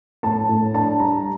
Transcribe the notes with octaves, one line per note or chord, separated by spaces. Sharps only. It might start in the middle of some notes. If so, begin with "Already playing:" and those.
A2 A5
A2
D4 A5
G3 A#5